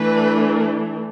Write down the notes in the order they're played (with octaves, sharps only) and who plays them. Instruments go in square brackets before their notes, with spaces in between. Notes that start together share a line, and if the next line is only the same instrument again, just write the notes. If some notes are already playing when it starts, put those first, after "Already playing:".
Already playing: [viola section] E3 A3 D4 B4